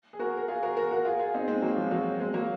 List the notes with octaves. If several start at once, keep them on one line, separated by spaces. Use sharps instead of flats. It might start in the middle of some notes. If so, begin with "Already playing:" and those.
G#4
F#4 A#4
A#4
F4 G#4
F#4 A#4
F#4 A#4
F#4 A#4
F4 G#4
F4 G#4
C4 D#4
G#3 C4
F#3 A#3
F3 G#3
F#3
G#3 C4
F#3 A#3